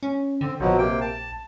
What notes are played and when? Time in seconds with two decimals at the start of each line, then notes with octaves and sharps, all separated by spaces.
0.03 C#4
0.41 D3 C4
0.60 A#1 B2 F3 F#3
0.79 C3 A#3 G5
1.01 A5